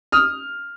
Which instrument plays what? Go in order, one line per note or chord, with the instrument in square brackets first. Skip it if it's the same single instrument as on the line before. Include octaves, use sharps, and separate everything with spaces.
[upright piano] D#6 F6